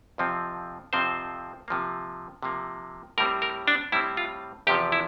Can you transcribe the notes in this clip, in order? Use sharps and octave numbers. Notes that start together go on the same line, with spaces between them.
F2 C3 F3 C4
F2 C3 F3 C4 C5
C3 F3 A#3
C3 F3 A#3
A2 G3 C4 A#4
A#4
D4
A2 G3 C4 E4
F4
E2 C3 F3 G4
E4